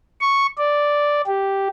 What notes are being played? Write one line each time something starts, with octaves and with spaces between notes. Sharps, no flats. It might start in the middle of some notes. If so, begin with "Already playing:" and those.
C#6
D5
G4